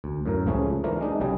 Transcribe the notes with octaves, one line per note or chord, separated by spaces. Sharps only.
D2
F#2 A2 A#4
C#2 F3 A3 G#4 C#5
E3 F3 A3 D4 A#4
G#3 D4 D#4
B1 C#3 G3 G#4